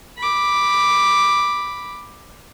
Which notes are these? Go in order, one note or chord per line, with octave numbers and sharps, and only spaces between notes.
B5 D6